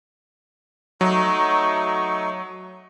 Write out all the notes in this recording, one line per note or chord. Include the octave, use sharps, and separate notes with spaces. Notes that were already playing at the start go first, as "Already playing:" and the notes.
F#3 A3 D#4 C#6